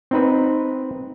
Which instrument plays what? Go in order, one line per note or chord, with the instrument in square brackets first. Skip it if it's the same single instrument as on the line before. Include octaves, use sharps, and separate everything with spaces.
[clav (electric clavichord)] C4 D#4 B4